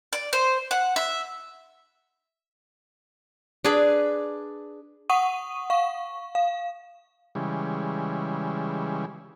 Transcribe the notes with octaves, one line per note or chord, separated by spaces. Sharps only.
D5
C5
F#5
E5
D4 G#4 B4
F#5 C#6 D#6 D#7
F5 C#6
F5
C#3 E3 G3 G#3